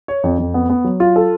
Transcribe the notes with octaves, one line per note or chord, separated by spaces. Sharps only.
C#5
F2
F2
B3
B3
F#3
F4
A4